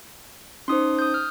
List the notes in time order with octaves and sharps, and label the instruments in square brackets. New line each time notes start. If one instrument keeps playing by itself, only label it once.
[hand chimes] C#4 D#4 C5 [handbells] C6 D#6
[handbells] D#6 G6
F6